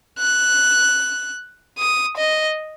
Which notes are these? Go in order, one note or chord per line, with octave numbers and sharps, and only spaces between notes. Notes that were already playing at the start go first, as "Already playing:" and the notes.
F#6
D#6
D#5